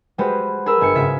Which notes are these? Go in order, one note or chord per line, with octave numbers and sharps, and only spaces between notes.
G3 G#3 F#4 G#4 B4 C5
G#4 A#4 B5 E6
G1 G#5 C#7
G#2 C#3 F4 E5 B6